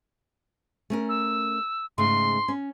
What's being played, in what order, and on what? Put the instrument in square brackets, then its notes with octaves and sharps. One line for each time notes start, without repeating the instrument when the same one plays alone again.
[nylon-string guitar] A3 C#4 A#4
[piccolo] E6
[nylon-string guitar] G#2 C#3 A3 [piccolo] C6
[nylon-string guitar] C#4